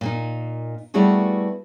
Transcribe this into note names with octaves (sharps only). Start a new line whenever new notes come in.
A#2 A#3 D#4
G3 A3 B3 E4 F#4 G#4